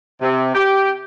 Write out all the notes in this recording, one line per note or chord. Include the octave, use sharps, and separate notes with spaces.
C3
G4